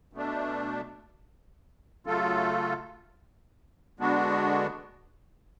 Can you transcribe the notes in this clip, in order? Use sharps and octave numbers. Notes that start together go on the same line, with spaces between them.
B2 A3 D4
C#3 F#3 A3 F4 A4
D3 G#3 B3 D4 F#4